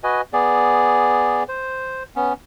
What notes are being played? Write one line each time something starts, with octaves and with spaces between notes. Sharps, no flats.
F#4 B4 D#5 G#5
B3 G#4 D5
C5
B3 C#4